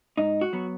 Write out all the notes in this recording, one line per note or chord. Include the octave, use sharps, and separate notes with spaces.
G#2 D#4
F#4
F#3 B3